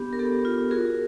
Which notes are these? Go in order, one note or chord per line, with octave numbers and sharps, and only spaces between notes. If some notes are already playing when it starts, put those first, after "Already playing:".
Already playing: B3 D4 G4
A#4
B3 G4 A4
F4
F#4 G#4 A#4